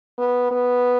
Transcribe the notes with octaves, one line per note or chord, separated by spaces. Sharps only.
B3
B3